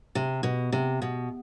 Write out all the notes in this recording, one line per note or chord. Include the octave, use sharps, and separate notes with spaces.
C3
B2
C3
B2